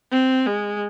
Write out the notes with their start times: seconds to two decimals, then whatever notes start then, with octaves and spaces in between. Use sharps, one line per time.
0.11 C4
0.46 G#3